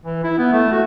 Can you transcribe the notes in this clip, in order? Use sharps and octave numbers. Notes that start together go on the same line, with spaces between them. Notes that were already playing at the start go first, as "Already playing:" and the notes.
E3
E4
B3
A3
F#4